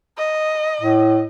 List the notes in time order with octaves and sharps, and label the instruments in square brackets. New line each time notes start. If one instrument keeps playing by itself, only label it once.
[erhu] D#5
[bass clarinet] A2